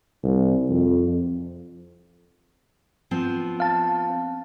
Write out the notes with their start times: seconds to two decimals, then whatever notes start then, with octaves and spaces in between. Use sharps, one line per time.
0.23 C2
0.70 F2
3.11 F3 B3 C4
3.60 F5 A5